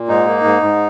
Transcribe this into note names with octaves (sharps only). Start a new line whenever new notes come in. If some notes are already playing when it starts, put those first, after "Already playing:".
Already playing: A#2
G#2 D#4
A#3
G#2
G#2